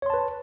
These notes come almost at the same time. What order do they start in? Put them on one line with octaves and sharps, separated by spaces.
C#5 C6 A5 B4